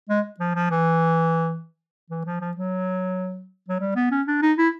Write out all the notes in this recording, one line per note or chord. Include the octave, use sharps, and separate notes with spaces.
G#3
F3
F3
E3
E3
F3
F3
F#3
F#3
G3
B3
C#4
D4
D#4
E4